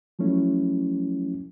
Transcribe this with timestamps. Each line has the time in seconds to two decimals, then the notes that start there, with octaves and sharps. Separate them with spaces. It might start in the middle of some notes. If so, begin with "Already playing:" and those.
0.19 F3 F#3 A3 C#4 E4